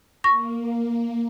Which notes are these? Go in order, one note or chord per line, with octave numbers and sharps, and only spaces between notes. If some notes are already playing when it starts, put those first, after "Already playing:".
A#3 C#6 A#6